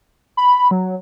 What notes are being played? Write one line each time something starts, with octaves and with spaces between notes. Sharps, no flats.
B5
F#3